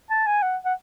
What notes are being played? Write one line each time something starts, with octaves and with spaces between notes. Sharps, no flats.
A5
G#5
F#5
F#5